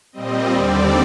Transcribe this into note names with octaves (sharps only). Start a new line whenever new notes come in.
A#2 G3 C4 D#5
D#2 D3 G3 C4 D5